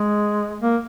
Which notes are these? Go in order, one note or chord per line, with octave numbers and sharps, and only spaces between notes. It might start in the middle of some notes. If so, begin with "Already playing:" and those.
Already playing: G#3
A#3